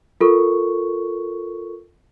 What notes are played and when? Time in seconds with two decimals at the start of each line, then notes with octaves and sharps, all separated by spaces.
0.21 F4 A4 A#4 C#6